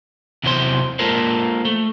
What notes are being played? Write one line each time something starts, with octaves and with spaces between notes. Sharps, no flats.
E2 C3 E3 F#3 C5 C6
G#3 A#3 F4 A4 A#4 C5
A3